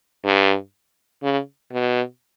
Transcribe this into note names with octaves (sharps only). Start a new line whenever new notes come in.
G2
C#3
B2